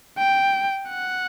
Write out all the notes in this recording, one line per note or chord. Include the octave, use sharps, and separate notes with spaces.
G5
F#5